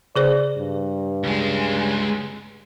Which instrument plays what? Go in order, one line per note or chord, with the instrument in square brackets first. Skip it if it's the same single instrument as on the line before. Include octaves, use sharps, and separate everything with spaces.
[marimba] C#3 G#4 C5 [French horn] D5
[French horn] G2
[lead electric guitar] C#2 G#3